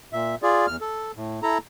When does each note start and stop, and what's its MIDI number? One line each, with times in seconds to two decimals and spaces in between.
0.13 0.35 46
0.13 0.35 76
0.43 0.66 65
0.43 0.66 68
0.43 0.66 74
0.67 0.76 40
0.67 0.76 89
0.81 1.12 69
1.16 1.40 45
1.43 1.58 64
1.43 1.58 69
1.43 1.58 82